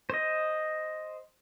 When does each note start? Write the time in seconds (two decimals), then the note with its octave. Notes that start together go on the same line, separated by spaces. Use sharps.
0.10 C5 D#5